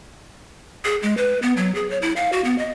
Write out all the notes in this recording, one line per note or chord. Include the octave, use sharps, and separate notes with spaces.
G#4
G#3
B4
B3
F#3
G#4
C#5
E4
F5
F#4
B3
D#5